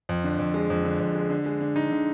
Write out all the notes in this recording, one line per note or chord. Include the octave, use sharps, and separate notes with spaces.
F2
D3
F2
G#3
F2
D3
F2
G#3
D3
G#3
D3
D#4
D3